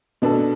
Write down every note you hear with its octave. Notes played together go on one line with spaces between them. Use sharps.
B2 B3 D4 A4